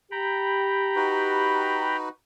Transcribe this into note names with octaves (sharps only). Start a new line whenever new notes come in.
G4 G5 A#5 B5
D#4 F#4 B4